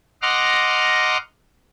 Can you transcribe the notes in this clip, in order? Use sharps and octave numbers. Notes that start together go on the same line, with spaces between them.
D#5 F#5 A#5 C6 D6 F6